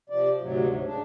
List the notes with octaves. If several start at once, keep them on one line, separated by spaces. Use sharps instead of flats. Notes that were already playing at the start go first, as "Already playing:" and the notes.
C3 F3 D5
D2 G#2 C3 F#3
C#3 D4